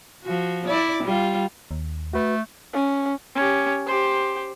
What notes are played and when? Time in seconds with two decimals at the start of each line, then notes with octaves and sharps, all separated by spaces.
0.23 F3 F#4
0.67 E4 D5
1.03 G3 F4
1.71 D#2
2.13 A3 F#4 B4
2.73 C#4
3.35 C#4 G4
3.86 G4 C5